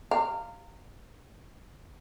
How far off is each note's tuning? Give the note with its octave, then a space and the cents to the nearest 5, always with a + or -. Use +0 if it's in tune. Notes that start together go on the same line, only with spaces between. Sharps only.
G4 +0 F5 +0 A#5 -25